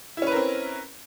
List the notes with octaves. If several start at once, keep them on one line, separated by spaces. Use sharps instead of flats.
C4 C#4 E4 A#4 B4